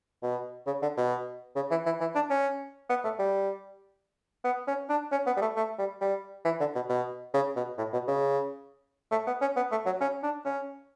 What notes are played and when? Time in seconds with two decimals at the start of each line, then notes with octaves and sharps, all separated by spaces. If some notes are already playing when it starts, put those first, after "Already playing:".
0.23 B2
0.66 C#3
0.82 D3
0.97 B2
1.55 C#3
1.71 E3
1.86 E3
2.00 E3
2.15 D4
2.30 C#4
2.89 B3
3.04 A3
3.19 G3
4.44 B3
4.67 C#4
4.89 D4
5.12 C#4
5.26 B3
5.37 G3
5.41 A3
5.56 A3
5.78 G3
6.01 G3
6.45 E3
6.60 D3
6.75 B2
6.89 B2
7.34 C#3
7.56 B2
7.78 A2
7.93 B2
8.07 C#3
9.11 A3
9.27 B3
9.41 C#4
9.56 B3
9.71 A3
9.86 F#3
10.00 C#4
10.23 D4
10.45 C#4